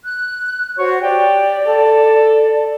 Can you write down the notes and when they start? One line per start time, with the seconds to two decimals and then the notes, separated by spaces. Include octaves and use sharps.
0.02 F#6
0.78 F#4 C5 C#5
1.02 G4 D5
1.67 A4